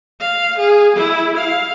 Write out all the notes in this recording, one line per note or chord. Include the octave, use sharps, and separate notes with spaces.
F5
G#4
E4
F5